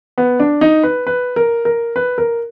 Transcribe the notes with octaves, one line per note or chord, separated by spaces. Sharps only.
B3
D4
D#4
B4
B4
A#4
A#4
B4
A#4